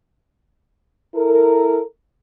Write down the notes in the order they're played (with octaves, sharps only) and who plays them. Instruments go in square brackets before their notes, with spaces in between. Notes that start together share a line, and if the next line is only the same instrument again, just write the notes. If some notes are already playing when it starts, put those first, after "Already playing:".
[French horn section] E4 A4 A#4